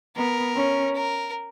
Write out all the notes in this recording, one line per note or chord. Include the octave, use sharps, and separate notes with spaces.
B3 A#4
C#4
A#4